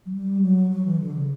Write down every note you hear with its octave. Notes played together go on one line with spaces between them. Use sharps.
F#3
G3
F#3
F#3
E3
D3
C#3